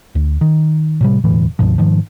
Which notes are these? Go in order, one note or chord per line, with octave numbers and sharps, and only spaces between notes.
D2
D#3
A2 C3 G3
E1 D2 A2 E3
C#2 G2 B2 F3
G#2 D#3 F3